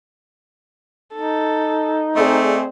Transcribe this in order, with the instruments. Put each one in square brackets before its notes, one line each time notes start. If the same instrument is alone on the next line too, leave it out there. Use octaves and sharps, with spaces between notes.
[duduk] D#4 [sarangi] A4
[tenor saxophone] A3 [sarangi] C4 [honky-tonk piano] G#4 D5 D#5